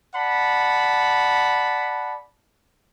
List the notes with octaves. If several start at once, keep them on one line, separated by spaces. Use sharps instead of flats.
D5 F#5 A5 B5